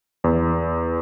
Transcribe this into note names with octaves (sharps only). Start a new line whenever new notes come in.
E2